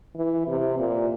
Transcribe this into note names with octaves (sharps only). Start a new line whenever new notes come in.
E3
C3
A#2